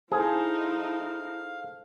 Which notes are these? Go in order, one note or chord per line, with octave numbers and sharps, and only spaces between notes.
D#4 E4 G#4 A4 C5 F5